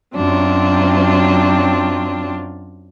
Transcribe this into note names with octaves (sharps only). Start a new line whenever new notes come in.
F#2 F#3 C4 D4 F4